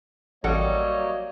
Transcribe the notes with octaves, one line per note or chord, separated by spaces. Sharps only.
A1 F#3 G3 A#3 A4 C#5 D#5 F#5